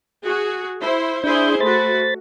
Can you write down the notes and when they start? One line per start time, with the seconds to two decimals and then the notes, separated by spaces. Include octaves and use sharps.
0.24 F#4 G#4
0.80 E4 C5
1.24 D4 E4 G#4 C5 G6
1.60 A3 F#4 C5 B5 A6